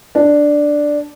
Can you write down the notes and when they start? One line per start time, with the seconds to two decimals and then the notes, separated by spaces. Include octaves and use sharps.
0.15 D4